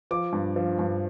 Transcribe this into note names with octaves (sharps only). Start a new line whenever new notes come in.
F3 D6
G2
F3
G2